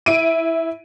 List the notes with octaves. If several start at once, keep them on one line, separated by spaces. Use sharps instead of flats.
E4 D7 D#7